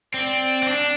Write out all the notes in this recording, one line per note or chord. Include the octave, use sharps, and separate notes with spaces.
C4 D5
C4
D4